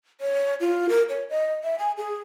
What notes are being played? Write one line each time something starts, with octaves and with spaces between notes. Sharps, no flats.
C#5
F4
A#4
C#5
D#5
E5
G#5
G#4